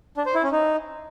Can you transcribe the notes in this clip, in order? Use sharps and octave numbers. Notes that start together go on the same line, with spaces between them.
D4
C5
E4
C#4
D#4